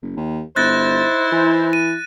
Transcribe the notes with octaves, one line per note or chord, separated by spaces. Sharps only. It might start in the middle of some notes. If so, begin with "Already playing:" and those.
F#1
D#2
G1 D#4 E4 C5 F#6 A6 A#6
E3
D#7